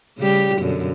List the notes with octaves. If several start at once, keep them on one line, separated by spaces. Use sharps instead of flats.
C#3 G3 G4
F#2 B2 D3